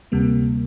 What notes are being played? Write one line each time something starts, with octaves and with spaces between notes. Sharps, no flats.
D2 C3 G3 A#3